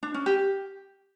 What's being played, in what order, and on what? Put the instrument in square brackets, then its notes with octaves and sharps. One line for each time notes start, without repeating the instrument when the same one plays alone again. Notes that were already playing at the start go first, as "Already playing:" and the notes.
[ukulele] D4
C#4
G4